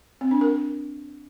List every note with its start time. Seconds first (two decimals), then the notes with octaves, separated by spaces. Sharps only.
0.21 C4
0.31 D4
0.41 A#4